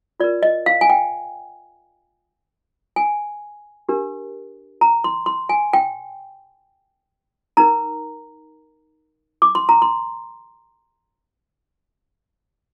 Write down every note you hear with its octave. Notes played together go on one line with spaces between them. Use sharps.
F4 A#4 D5
D#5
F5
G#5
G5
G#5
D4 G4 A#4
A#5
C6
C6
G#5
G5
D#4 A#4 A#5
D6
C6
A#5
C6